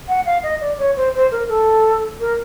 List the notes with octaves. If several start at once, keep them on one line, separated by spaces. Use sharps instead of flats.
F#5
F5
D#5
D5
C#5
C5
C5
A#4
A4
A#4